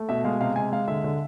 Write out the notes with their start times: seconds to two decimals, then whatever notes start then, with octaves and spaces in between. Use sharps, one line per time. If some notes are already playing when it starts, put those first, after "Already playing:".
Already playing: A3
0.09 B2 E5
0.24 G#3 F5
0.41 C3 F5
0.56 G#3 G#5
0.72 G#3 F5
0.88 D3 E5
1.04 D3